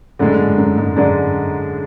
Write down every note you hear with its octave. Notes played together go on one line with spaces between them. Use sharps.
F#2 A2 D3 G#3 D4
G#2
F#2
G#2
F#2 D3 G#3 D4